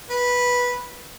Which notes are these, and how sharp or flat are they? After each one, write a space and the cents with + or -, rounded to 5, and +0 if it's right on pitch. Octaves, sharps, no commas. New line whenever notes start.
B4 -10